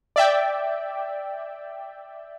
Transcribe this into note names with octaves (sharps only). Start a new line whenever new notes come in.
D5 E5 G5